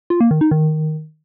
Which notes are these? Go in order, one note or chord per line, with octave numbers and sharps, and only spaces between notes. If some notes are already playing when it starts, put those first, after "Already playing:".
F4
A#3
D#3
D#4
D#3